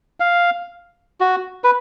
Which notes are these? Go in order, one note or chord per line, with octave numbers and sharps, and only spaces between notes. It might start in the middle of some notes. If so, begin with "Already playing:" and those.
F5
F#4
B4